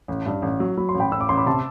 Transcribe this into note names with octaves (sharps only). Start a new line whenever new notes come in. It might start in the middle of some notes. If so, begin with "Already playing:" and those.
A1
G2
A1
F#3
F#3 B5
C6
A1
G5 B5
A1 E6
D6
A1 C6
B5 D6
C3 A5 C6